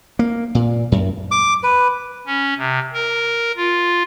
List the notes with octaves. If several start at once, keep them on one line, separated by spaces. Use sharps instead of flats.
A#3
A#2
F#2
D6
B4
C#4
C3
A#4
F4